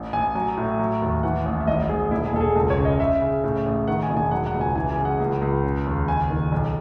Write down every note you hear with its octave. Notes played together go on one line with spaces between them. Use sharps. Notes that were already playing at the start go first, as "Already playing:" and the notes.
Already playing: A1
A1 G#5
F#3 G#5
A2
F#3
D#2
E3 F#5
A1
E5
G#1 D#5
G#1 G#4
E1 E4
G#4
E1 A4
G#4
C#2 A4
C#5
C#3
D#5
C#3 E5
C#3
A2
A1
D#3 F#5
G#5
E1
G#5
F#3 F#5
F#5
C#2
G#5
E3 G#5
G#5
C#3
F#5
C#2
C#2
C#3
D#2
F#1 G#5
D#3
B1